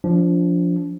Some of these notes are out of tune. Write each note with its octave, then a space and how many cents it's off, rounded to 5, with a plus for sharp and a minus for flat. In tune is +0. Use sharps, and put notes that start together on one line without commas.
F3 +0 D4 -25